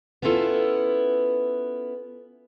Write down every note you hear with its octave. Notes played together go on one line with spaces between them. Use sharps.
B3 C#4 E4 F4 A4